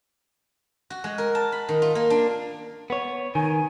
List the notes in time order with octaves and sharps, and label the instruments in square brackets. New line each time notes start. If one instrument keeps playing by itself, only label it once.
[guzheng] F#4
G#3
A#4
A5
B5
D#3
F4
A#3
D4
[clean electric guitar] B3 C#5
[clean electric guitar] D#3 [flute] G#5